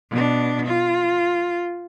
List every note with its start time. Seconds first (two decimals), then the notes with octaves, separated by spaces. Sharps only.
0.11 B2 D4
0.66 F4